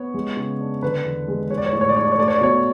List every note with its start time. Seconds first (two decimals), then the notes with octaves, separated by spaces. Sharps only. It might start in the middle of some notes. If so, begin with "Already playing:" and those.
Already playing: B3 C#5
0.14 G#3
0.37 C#3
0.60 D4
0.82 D3 B4
1.05 E2
1.28 G#3
1.50 G#3 C#5
1.58 D5
1.66 C#5
1.73 A2 D5
1.81 C#5
1.89 D5
1.96 D4 C#5
2.04 D5
2.12 C#5
2.18 A3 D5
2.28 C#5
2.35 D5
2.41 B2 C#5